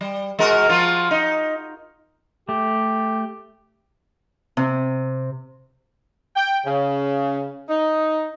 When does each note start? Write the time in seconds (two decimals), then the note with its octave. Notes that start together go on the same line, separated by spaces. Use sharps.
0.01 G3
0.39 G#3 F#4 A#4
0.69 F3 F4
1.11 D#4
2.49 A3 G4
4.57 C3
6.35 G5
6.65 C#3
7.69 D#4